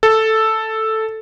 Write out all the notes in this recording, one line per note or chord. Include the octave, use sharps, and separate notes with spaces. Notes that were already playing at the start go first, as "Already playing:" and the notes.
A4